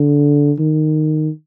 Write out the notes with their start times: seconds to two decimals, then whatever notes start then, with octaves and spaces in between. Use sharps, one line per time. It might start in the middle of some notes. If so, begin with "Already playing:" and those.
Already playing: D3
0.59 D#3